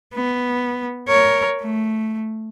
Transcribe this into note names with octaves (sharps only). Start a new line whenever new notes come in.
B3
A#4 C#5
A3